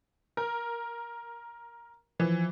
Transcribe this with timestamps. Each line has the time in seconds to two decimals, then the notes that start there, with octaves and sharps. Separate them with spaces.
0.37 A#4
2.20 E3 F3